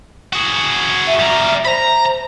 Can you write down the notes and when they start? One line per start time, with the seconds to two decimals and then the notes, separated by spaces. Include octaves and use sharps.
0.33 F#4 G#4
1.07 E5
1.19 G3 A#4
1.65 C5 A#5 B5